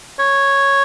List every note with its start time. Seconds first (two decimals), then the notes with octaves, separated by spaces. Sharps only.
0.19 C#5